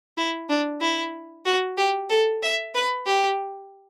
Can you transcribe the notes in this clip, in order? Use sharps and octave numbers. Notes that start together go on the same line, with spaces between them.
E4
D4
E4
F#4
G4
A4
E5
B4
G4